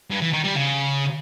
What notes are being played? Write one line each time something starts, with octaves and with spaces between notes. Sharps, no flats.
G2
E3
D#3
G3
C#3